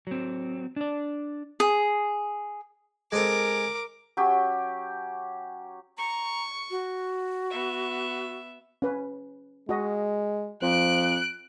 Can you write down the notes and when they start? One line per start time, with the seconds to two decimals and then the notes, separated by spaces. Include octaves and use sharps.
0.07 F#3 C4
0.76 D4 D5
1.60 G#4
3.12 G#3 C4 A4 A#4 D6
4.17 F#3 C#4 G4
5.98 A#5 C#6
6.71 F#4
7.50 B3 E5
8.82 C#4 B4
9.69 G#3 F#4 D#5
10.62 F2 F3 C5 F#6 D7